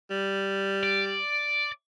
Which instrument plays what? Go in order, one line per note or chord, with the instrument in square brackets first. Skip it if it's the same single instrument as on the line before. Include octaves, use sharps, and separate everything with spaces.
[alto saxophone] G3
[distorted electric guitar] D5